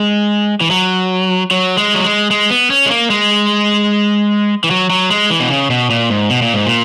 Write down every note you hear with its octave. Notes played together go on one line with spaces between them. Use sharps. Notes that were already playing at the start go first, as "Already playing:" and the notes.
Already playing: G#3
E3
F#3
F#3
G#3
F#3
G#3
G#3
B3
C#4
G#3
A#3
G#3
E3
F#3
F#3
G#3
E3
B2
C#3
B2
A#2
G#2
B2
A#2
G#2
A#2